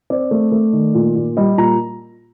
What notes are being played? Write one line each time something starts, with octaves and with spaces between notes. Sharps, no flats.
C4 D5
A3
A3
D#3
A#2
A#2
G3 D#5
A#2 A#5